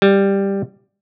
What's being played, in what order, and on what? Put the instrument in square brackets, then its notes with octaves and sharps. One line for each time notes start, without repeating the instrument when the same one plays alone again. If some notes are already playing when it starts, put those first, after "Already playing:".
[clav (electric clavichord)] G3